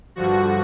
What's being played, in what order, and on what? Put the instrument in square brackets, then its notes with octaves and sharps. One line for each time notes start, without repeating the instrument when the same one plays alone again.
[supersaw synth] G2 D3 F3 F#4